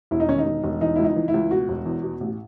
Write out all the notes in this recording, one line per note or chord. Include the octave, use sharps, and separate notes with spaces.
E1 E4
D#4
D#3 C#4
D#4
E1
E1
E3 D#4
C#2 E4
D#4
E3
E4
C#2
B2 F#4
E1
E2
B2
A1